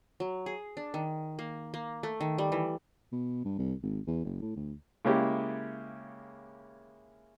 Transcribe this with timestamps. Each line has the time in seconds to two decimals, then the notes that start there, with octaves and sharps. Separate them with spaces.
0.20 F#3
0.46 G#4
0.77 D4
0.94 D#3
1.39 A#3
1.74 A#3
2.03 A3
2.21 D#3
2.38 G3
2.52 E3
3.13 B2
3.45 G2
3.59 C2
3.83 G#1
4.07 E2
4.25 F#1
4.41 A2
4.56 D2
5.05 C#3 G#3 A#3 C#4 E4 G4